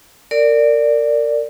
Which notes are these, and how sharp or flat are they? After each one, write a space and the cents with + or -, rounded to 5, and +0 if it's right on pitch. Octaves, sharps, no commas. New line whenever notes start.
A#4 -25 D5 +0